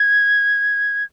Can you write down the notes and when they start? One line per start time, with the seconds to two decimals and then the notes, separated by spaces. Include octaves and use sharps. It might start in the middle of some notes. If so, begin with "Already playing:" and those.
Already playing: G#6